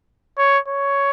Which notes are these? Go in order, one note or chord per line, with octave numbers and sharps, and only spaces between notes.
C#5
C#5